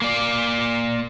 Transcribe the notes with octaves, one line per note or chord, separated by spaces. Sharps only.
A#3 D5